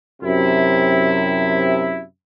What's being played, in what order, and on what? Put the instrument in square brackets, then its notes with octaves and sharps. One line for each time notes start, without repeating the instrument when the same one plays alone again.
[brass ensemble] F#2 C3 E4